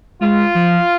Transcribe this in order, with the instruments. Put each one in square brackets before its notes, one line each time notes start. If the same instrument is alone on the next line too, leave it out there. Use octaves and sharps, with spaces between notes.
[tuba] G#3 [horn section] F4
[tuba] F3